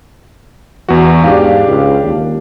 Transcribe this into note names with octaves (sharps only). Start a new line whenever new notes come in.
E2 E3 F#4
G#2 D4 G4 F5
C#2
D#2